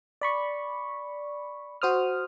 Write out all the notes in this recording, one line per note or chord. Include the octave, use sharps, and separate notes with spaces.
D5 B5 C#6
F#4 C5 D#6 F6